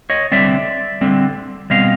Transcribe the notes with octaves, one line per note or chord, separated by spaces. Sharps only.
C#5 D#5
D3 G3 C4 D5 E5
D3 G3 C4
B2 G3 C4 D#5 F5